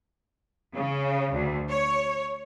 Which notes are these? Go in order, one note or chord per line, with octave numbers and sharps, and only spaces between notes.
C#3
D2
C#5